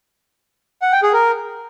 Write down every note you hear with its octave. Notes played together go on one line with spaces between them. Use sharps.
F#5
G5
G#4
A#4